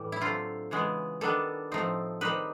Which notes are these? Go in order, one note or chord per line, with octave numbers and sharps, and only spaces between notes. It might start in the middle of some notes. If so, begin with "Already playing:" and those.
Already playing: A2 E3 G3
E4
D3 F#3 A3 C4 F4
C#3 E3 G#3 B3
D#3 G3 B3 D4 A4
A2 F3 A3 C4 D#4
D#3 G3 C4 D#4 B4